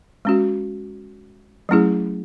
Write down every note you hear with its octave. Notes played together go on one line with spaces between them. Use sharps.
G#3 C#4 F#4
F#3 A3 C#4 E4 G#4